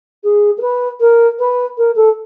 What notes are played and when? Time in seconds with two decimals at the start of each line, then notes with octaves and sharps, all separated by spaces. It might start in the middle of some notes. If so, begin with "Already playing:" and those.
0.24 G#4
0.58 A#4
0.61 B4
1.00 A#4
1.39 B4
1.77 A#4
1.95 A4